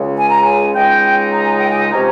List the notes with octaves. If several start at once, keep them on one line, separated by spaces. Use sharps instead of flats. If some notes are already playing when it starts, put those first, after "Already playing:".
Already playing: C#2 C#3 G#3
G#5
A#5
G#5
C#2 C#3 G#3 D#4 G5
A#5
G#5
G5
G#5
C3 F3 G#3 C#4 A#5